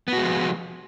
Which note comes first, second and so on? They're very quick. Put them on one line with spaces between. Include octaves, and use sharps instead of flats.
B3 F#4 G#3 F3